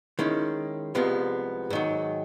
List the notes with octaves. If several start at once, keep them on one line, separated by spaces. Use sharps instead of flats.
D#3 G#3 C#4 E4
C2 C3 F3 G#3 B3
G#2 D#3 F#3